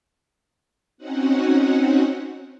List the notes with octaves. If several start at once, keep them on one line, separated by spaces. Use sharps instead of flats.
C4 C#4 D#4 F#4 F#5